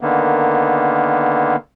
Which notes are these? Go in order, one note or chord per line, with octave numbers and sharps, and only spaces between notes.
D3 D#3 A#3 B3